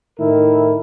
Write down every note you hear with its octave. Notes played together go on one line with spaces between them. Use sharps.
A2 D#3 E4 A#4